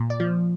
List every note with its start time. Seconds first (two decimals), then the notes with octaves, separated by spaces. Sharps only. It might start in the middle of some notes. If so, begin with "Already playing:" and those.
Already playing: A#2
0.10 D5
0.20 F3